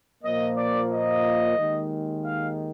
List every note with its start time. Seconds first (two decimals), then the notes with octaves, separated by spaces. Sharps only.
0.24 A#2 F3 A#3 D#5
0.56 D5
0.91 D#5
1.57 D#2 D#3 G#3
2.25 F5